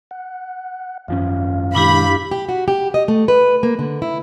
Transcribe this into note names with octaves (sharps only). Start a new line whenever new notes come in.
F#5
G#1 F#2 F3 C#4 F5
A#2 D#3 G#3 D4 E4 G4 B5
G4
F#4
G4
D#5
A3
B4
A#3
D3
E4